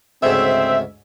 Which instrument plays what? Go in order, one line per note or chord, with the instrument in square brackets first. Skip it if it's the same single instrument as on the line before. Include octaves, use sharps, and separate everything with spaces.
[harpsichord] D2 G#2 C#3 [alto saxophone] C4 [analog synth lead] E5